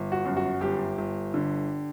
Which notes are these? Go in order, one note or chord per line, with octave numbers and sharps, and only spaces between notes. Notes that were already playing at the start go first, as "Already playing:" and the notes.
Already playing: G1
F#4
F#2
F#4
G1 G4
G1
D3